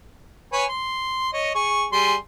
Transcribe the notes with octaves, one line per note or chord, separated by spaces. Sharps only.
B4 C#5 G#5
C6
C#5 D#5
G#4 C#6
G3 G#4 C6